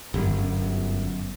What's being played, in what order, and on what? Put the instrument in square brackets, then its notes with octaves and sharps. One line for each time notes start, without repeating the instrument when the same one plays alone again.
[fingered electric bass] G1 F#2